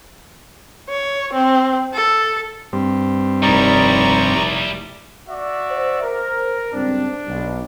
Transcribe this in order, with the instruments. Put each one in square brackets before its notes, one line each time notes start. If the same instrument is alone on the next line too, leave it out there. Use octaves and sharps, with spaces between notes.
[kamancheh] C#5
C4
A4
[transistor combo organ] G2 C4
[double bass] F1 D#4 [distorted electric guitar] G3 E4 [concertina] D5 A#5 C#6
[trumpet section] F#4 D5 E5
[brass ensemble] C5
[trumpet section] A#4
[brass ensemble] C#2 G2 C4 [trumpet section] D4
[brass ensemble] B1